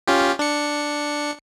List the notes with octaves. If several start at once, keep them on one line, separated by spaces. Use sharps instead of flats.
C#4 F4 G4
D4 C#7